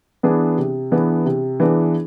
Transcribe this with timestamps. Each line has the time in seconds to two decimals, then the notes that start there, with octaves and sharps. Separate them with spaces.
0.23 E3 B3 D4 G#4
0.58 C3
0.91 E3 B3 D4 G#4
1.26 C3
1.60 E3 B3 D4 G#4